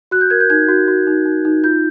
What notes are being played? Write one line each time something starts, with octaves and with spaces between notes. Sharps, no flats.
F#4 F#6
G6
A#4 G#6
G6
D#4 G#6
F#4 G6
F#4
D#4
D#4
D#4
F4 G6